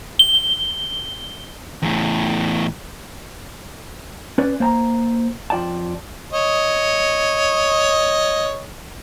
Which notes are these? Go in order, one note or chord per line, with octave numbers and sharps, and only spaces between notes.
G7
E2 A2
C#4 B4 D5
A#3 C5 A5 A#5
F2 F4 D5 G5 A5
C#5 D#5